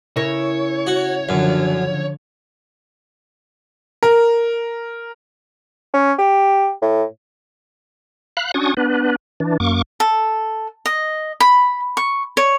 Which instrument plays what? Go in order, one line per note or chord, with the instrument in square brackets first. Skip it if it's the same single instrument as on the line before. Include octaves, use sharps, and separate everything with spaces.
[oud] C#3 E4 A#4 [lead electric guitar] C#5
[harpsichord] F#4
[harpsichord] F#2 [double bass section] D3 F3
[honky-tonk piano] A#4
[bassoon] C#4
G4
A2
[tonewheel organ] F5 B5 F#6
C#4 D4 F#4 C#6 D#6
B3 D4 B4
E3 D4
F#2 A#3 C#6 D6
[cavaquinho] A4
D#5
B5
C#6
C#5